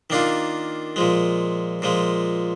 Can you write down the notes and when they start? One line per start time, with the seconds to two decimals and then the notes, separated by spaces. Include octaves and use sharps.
0.10 D#3 A#3 D4 F4
0.96 A#2 F3 G#3
1.82 A#2 F3 G#3